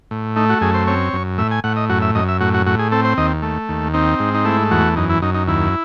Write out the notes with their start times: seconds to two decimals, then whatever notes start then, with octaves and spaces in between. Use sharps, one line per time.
0.11 A2
0.36 A3 D#4
0.49 F#4
0.61 F#2 G#4
0.74 C5
0.87 C4 C#5
1.13 F#2
1.38 A2 E5
1.51 G#5
1.64 A2 F#5
1.76 D#5
1.89 F#2 F#4
2.02 E5
2.15 F#2 D#5
2.28 E5
2.40 A2 F#4
2.54 F#4
2.66 A2 F#4
2.79 G#4
2.92 C4 A4
3.04 C5
3.17 D#2 D#5
3.42 A3
3.69 D#2
3.94 C4 D#4
4.19 G#2
4.35 D#4
4.45 A3 E4
4.71 E2 F#4
4.96 F#2 D#4
5.10 E4
5.22 F#2 D#4
5.34 D#4
5.47 D#2 E4